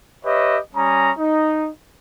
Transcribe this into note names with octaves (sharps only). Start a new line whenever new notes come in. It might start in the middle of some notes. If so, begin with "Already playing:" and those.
G4 B4 C#5 D#5 E5
G3 C#4 G#5 A#5 D#6
D#4